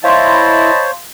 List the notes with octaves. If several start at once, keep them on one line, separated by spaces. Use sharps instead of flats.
E4 C5 C#5 D#5 F5 A5 B5 C6